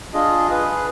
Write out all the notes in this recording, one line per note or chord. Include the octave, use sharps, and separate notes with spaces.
D4 F4 G#4 D#5
G#4 B4